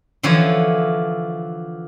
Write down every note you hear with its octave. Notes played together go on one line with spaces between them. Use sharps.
D3 E3 F3 C#5